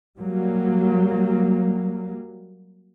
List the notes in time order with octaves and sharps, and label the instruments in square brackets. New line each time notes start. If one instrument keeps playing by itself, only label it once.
[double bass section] F#3 G3 A#3